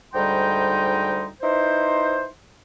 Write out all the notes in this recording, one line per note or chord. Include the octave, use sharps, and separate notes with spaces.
D2 G#2 G3 D#4 G5 C6
D#4 E4 B4 C5